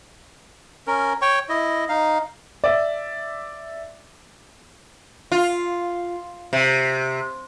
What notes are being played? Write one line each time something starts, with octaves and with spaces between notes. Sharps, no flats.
C#4 A#4
C#5 G5 C#6
E4 D#5
D#4 F5
D5 E5
F4
C3